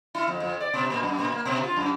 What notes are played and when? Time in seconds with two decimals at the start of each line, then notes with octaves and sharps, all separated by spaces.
0.15 E4
0.28 F2
0.40 F2
0.60 D5
0.74 B2
0.90 A#2
1.03 F#2
1.19 A#2
1.32 A#3
1.45 B2
1.64 F4
1.77 F#2